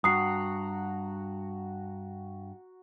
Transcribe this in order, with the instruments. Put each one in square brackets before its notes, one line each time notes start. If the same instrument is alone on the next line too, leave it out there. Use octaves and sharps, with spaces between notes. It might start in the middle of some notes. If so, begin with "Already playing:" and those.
[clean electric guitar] G2 [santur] F#4 F#5 A#5 [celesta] D#6 C7